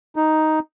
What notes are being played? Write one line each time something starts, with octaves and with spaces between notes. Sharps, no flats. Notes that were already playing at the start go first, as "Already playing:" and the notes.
D#4